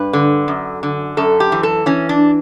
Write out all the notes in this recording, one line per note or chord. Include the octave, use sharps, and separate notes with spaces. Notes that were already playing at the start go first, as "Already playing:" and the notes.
Already playing: G2 B4
D3
F#2
D3
F#2 A4
G4
E3
A4
E3 C#4
D4